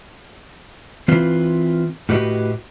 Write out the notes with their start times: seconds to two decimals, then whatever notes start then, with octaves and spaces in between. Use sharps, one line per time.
1.08 E3 C4 F4 B4
2.09 A2 F#4 G4 B4 D#5